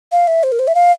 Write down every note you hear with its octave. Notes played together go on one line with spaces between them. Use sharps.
F5
E5
C5
A#4
C5
E5
F5